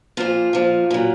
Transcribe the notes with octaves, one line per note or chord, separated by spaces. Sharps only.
A#2 F3 F4
A#2 F3
A#2 F#3